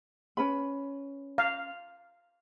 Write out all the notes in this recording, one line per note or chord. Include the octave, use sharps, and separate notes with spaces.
C#4 B4 B5
F5